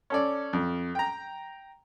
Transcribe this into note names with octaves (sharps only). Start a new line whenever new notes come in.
C#4 A4 D5
F2
G5 A#5